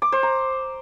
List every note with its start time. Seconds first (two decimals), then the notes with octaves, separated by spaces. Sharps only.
0.02 D6
0.12 C5
0.23 A#5